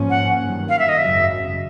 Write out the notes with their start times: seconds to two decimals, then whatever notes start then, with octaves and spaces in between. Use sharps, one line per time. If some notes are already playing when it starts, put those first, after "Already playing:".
Already playing: G#2 F3 A#3 C#4
0.10 F#5
0.40 G2 D#3 F#3
0.69 F5
0.79 E5
0.89 D#5
0.98 G#1 F#2 C#3 F#3 E5